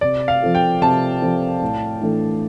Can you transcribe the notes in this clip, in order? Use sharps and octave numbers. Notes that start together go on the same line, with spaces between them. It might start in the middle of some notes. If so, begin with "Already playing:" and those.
C3 D5
F5
F3 C4 F4 A4
G5
C3 A5
F3 C4 F4 A4
A2
E3 A3 D4 A4